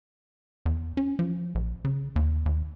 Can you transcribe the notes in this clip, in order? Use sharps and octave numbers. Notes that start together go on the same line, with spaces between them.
E2
C#4
F3
A#1
C#3
D#2
D#2